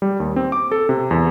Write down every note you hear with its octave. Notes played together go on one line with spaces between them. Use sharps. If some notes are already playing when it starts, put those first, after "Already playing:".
G3
D#2
C4
D6
A4
C3
E2